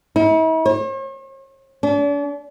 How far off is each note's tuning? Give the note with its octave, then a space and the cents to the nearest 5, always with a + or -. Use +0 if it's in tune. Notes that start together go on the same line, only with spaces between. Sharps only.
E4 -45
C#5 -45
D4 -40